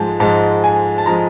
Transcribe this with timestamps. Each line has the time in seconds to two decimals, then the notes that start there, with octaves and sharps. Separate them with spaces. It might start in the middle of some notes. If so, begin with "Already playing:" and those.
Already playing: G#2 F3 G#3 G#5 A5
0.20 G#2 F3 G#3 A5
0.64 G#5
0.98 A5
1.06 F3 G#3 A#5